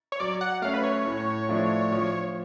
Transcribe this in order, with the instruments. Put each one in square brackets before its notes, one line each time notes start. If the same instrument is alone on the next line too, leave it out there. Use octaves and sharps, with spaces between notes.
[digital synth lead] C#5
[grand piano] F#3 [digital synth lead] D5
[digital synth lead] F#5
[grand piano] A3 C#4 [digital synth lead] F5
[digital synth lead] B4
C#5
[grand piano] A2
F3 A3 D4
F3